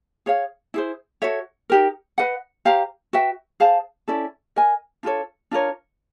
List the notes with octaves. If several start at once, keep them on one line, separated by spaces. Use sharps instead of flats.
G#4 C#5 F5
E4 G#4 C5
F#4 A4 C#5 E5
D#4 G4 A#4
B4 D#5 F#5
G4 C5 F5 A#5
F#4 B4 E5 G5
G#4 C5 F5 A5
C#4 E4 A4 D5
A#4 D#5 G#5
D4 F4 A4 C#5
D4 F4 A#4 C#5